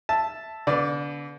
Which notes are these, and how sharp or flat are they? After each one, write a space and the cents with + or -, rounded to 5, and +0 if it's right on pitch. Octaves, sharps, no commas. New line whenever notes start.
E5 +0 A5 +0
D3 -30 B3 +0 D5 +0